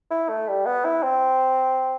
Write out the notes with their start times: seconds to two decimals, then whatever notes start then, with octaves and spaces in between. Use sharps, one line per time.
0.11 E4
0.29 A3
0.48 G3
0.66 B3
0.85 E4
1.03 C4